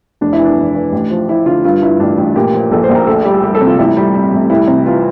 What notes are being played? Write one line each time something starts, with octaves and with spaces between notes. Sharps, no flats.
F1 D4
E4
E3
D4
F1
E3
A1
F3
F3 E4
D3 F4
G2 F4
G2 E4
A1 D4
A1
A#2 G4
F3
A#1 A4
C5
A#1
A#4
D2 A4
G3 G4
G3
A4
C3
F4
A1 E4
G3
G3
A1
C2 E4
C3
E3 F4